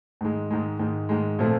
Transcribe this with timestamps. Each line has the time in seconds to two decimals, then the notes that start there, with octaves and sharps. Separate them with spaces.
0.21 G#2 D#3 G#3
0.51 G#2 D#3 G#3
0.79 G#2 D#3 G#3
1.09 G#2 D#3 G#3
1.39 A#2 F3 A3 C4